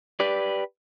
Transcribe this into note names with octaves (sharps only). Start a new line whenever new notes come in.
G4 B4 D5